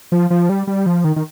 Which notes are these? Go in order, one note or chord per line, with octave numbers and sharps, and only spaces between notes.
F3
F3
G3
G3
F3
D#3
D#3